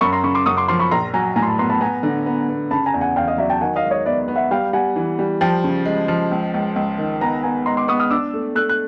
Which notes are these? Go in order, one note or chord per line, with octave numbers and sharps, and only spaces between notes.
F#2 B5 C#6
A#5 C6
C#3 B5 C#6
C6 D6
F#2 C#6 D#6
C6 D6
F3 C6 D6
B5 C#6
A#1 A#5 C6
F#3 G#5 A#5
A2 G#5 A#5
C6
A5 B5
B3 A#5 C6
A5 B5
B3 G#5 A#5
D3
B3
B3
C#3 A5 B5
G#5 A#5
E2
F#5 G#5
E2 F5 G5
D#5 F5
F#3 D5 E5
G5 A5
D#3 F#5 G#5
D#5 F5
G#3
C#5 D#5
B3 D5 E5
B3
E5 F#5
G3 F5 G5
G3 F#5 G#5
E3
G3
F3 G5 A5
C#3
G#3
F3
C#2
C#2
C#2
D#3
B3 G#5 A#5
B3 G#5 A#5
G#3 A#5 C6
C6 D6
B3 C#6 D#6
D#6 F6
D4 D6 E6
A3
A3 E6 F#6
F#6